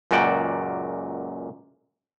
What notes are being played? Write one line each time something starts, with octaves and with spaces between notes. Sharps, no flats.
C#2 F#2 A#2 F#4 D5 G5